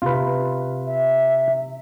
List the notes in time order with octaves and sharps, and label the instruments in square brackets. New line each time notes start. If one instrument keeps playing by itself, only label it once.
[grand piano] C3 [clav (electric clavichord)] F4 B4
[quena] E5